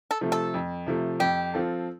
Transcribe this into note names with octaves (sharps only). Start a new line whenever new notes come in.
A4
C3 F3 A3
A4
F2
C3 F3 A3
F2 G4
F3 C4 F4 A4